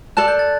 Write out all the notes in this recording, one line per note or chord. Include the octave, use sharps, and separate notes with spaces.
A4 D5 A5 F#6
G6
A6